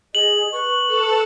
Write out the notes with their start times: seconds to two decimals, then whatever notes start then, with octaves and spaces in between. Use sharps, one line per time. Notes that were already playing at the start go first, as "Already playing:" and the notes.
0.15 G#4 D#5 F#7
0.52 B4 C#6
0.87 A4 A5